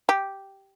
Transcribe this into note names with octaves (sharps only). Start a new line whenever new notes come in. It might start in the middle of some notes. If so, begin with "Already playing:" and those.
G4